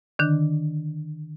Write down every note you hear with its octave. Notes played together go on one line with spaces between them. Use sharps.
D3 D#3 D4